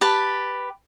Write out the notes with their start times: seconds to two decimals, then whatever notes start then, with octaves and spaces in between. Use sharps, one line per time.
0.01 G4 B4 A5